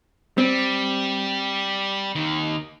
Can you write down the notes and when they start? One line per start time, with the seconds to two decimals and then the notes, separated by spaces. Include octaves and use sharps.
0.38 G3 C4
2.15 D#2 D#3